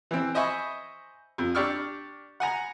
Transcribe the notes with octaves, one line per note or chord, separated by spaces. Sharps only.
E3 C4
C5 D#5 E5 G#5 B5 C#6
F2
D4 G4 D5 C#6 E6 F6
F#5 G#5 A#5